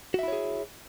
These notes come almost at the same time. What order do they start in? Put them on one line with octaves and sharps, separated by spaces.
F#4 E5 E4 C#5 G#4